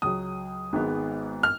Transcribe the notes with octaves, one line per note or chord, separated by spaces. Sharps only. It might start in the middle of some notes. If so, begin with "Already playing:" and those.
C#2 C#3 F#3 D#6
G#1 G#2 D#3 G#3 B3
F6